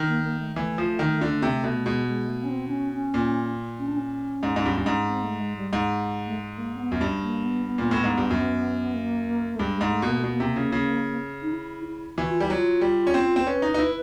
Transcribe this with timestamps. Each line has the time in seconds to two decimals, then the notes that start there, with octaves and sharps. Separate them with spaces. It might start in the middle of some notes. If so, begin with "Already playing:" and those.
Already playing: D#3
0.08 A#3
0.24 A#3
0.40 A3
0.56 E3 A3
0.78 F3
0.99 D#3
1.21 D3
1.42 C3
1.64 B2
1.85 B2 G#3
2.07 G#3
2.28 A3
2.43 C#4
2.49 C4
2.68 D4
2.71 C#4
2.93 C#4
3.14 A#2
3.79 C#4
3.88 D4
3.97 C#4
4.43 G#2
4.56 G#2
4.65 G2
4.77 G2
4.86 G#2
5.08 C4
5.24 A3
5.40 G#3
5.57 G3
5.73 G#2
6.27 A3
6.37 G#3
6.58 A#3
6.75 C4
6.79 B3
6.92 F#2
7.01 G2
7.22 A#3
7.44 B3
7.66 B3
7.78 A#2
7.91 A2
8.04 G#2
8.17 G2
8.30 F#2
8.94 A#3
9.56 A3
9.59 G2 G#3
9.76 G#3
9.81 G#2
9.87 G#3
9.92 A3
10.02 B2
10.08 A#3
10.19 B2 A3
10.30 A#3
10.40 C3
10.56 C#3
10.72 C#3
11.42 D#4
11.53 E4
11.85 E4
12.17 E3 F#4
12.30 F4
12.40 G3 E4
12.50 F#3 F4
12.81 G3
13.07 C#4
13.14 C4
13.36 C4 C5
13.47 C#4 B4
13.62 D#4
13.74 D#4
13.79 E4